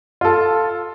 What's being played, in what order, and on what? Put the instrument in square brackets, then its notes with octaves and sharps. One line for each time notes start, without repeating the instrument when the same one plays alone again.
[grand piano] F4 A4